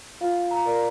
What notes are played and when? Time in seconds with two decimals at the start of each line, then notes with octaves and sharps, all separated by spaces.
0.21 F4 F5
0.51 A#5
0.66 A#4 D5